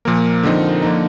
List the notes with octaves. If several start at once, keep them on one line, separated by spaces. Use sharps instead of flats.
A#2 F3 A#3 A#4
D3 F3 C4 D#4
D3 F3 A#3 D#4